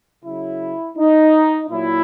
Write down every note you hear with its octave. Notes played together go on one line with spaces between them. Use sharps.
C#3 F#3 E4
D#4
A#2 F#3 E4